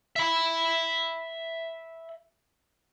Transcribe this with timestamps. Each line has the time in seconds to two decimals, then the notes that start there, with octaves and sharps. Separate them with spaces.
0.16 E5 B5